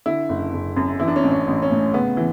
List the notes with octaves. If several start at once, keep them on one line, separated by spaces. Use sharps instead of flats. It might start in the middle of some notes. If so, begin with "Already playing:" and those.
D3 E4
F#1
F#1
F#2
E3 E4
D4
C#4
A1 D4
C#4
A1
C#4
A2
C#3 B3
E3